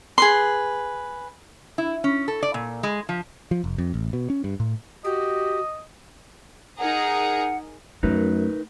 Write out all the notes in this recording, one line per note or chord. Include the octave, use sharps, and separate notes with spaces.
G#4 B4 C6
E4
C#4
A4
D5
A#2
G#3
F3
F3
F1
F2
A1
B2
C#4
G2
A2
F#4 G4 D#5
D#4 G#4 A#4 F#5
F#2 A3 D#4 A#4 B4